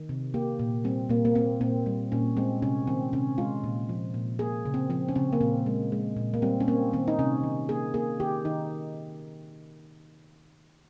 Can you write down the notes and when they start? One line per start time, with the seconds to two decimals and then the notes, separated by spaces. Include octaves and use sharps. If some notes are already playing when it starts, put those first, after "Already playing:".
Already playing: D#3
0.09 C3
0.34 A#3 G4
0.59 A#2
0.84 G3 C4
1.09 A#2 A#3
1.25 A#3
1.35 A#3 C4
1.61 A#2 C4
1.86 G3
2.12 A#2 C#4
2.37 G#3 C4
2.62 C3 C#4
2.87 D#3 C4
3.13 C3 C#4
3.38 G#3 F4
3.64 A#2
3.89 F3
4.14 A#2
4.39 A#3 G#4
4.65 C#3
4.74 C4
4.90 F3 C4
5.09 C#4
5.16 C#3 C4
5.33 A#3
5.41 A#2 C4
5.66 G#3
5.92 G#3
6.17 A#2
6.34 A#3
6.42 G3 C4
6.60 C#4
6.68 A#3 C4
6.93 D#3 C4
7.08 D#4
7.19 C3 C#4
7.43 D#3
7.69 A#3 G#4
7.94 A#3 G#4
8.20 D#3 G4
8.45 D#3 D#4